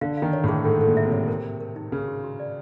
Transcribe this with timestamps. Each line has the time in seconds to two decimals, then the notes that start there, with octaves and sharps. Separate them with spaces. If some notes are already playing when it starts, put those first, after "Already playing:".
0.01 D3 F5
0.17 D#3 F5
0.33 C#5
0.44 A2 G#4
0.64 G#2 A4
0.81 A#2 A4
0.97 E5
1.06 C3
1.12 C#5
1.28 A#4
1.44 A#4
1.60 A#4
1.76 D#4
1.92 C#3 A#4
2.08 F#4
2.23 F#4
2.40 D5